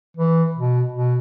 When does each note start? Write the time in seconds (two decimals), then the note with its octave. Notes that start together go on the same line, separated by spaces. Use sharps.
0.17 E3
0.55 B2
0.92 B2